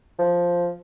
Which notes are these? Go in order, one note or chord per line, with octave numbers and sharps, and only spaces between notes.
F3